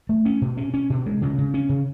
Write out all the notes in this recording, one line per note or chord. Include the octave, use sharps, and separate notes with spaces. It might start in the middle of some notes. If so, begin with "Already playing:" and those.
A3
C#4
B2
C#4
C#4
B2
G#3
C#3
C#3
C#4
C#3